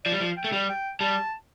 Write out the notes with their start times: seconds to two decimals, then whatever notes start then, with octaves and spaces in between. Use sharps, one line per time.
0.05 F3 D5
0.12 G3
0.20 F3
0.37 G5
0.44 A3
0.52 G3
0.69 G5
1.00 G3 A5